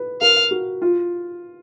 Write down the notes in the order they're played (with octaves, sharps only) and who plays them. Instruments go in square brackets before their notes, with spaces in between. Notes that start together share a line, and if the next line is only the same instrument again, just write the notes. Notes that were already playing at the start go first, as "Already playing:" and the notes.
Already playing: [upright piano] B4
[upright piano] A#4 [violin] F5
[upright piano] F#4
F4